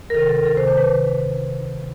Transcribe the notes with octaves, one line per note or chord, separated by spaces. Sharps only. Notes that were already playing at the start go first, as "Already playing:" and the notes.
A#4
C3 D#3 A4
A4
D2 A#4
A4
C3 D#3 C5
C5
B4